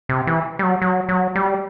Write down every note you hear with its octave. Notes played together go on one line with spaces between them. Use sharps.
C3
E3
G3
F#3
F#3
F#3
G3